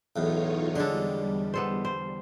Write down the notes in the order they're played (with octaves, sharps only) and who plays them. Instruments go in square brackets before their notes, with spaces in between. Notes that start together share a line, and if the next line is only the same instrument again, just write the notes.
[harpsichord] B1 E2 A2 [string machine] D#4 F4 C#5
[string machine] E2 G3 [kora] D3 D4 A4 [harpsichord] G#3 C#5
[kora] B3 A4 C5
C5